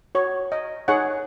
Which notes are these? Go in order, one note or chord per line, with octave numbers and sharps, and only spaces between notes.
F#4 C#5
D#5
D#4 G#4 C#5 F#5